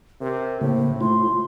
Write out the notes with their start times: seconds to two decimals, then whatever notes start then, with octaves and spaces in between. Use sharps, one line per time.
0.21 C3 A#4
0.61 A2 C#3 A#3 C5
1.01 A3 E4 F4 C6